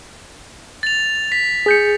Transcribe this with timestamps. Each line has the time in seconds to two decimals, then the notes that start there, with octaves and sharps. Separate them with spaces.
0.83 A6 F7
1.32 B6
1.66 G#4 G6 C#7